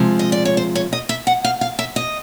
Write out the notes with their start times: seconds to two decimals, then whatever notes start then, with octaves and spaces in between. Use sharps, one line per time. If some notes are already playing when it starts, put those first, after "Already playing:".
Already playing: C3 F3 G#3
0.19 D#5
0.32 D5
0.45 C#5
0.57 C5
0.75 C#5
0.93 D#5
1.09 E5
1.27 F#5
1.44 F5
1.61 F5
1.79 E5
1.96 D#5